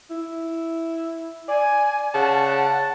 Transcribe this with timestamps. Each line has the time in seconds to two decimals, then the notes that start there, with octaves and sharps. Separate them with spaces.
0.10 E4
1.48 D5 G#5
2.14 C#3 F#5 A5